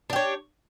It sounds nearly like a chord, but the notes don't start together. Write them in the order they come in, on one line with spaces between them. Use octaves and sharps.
D4 G4 C#5